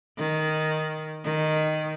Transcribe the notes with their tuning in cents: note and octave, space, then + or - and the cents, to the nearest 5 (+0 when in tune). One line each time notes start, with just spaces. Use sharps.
D#3 +0
D#3 -5